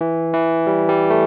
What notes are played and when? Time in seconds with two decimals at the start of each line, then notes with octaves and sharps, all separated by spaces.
0.01 E3
0.34 E3
0.67 G3
0.89 G3
1.10 A3